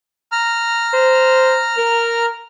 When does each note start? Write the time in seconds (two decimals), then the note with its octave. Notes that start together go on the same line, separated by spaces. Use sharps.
0.32 A#5 F6
0.93 C5
1.77 A#4